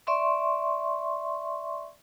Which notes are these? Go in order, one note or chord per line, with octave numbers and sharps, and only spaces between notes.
D5 E5 C6 C#6